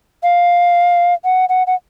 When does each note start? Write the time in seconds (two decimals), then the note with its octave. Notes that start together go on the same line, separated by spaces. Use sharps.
0.23 F5
1.24 F#5
1.49 F#5
1.67 F#5